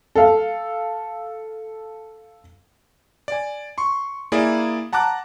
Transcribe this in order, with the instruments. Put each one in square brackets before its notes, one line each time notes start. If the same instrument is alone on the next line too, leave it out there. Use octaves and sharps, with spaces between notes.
[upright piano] A4 F5
[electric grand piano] D5 G#5
C6 C#6
A#3 E4 G#4 D5
F#5 A5 A#5 D6 F#6